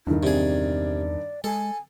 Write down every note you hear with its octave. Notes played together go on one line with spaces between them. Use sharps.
E2 G2 D#3 E4
C3 G#4 D5
G#3 A4 G#5